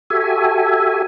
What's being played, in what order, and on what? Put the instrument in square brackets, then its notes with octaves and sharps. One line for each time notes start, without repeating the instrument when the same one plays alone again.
[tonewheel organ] F#4 G4 A4 E5 G#5